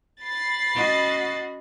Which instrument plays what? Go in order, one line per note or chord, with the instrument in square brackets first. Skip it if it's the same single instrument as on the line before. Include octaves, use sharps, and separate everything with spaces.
[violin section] B5 A6 C7
[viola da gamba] C#4 F#4 D#5